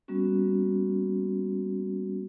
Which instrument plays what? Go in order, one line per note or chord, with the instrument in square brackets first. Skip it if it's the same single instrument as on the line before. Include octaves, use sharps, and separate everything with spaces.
[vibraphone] G3 A#3 B3 C#4 F#4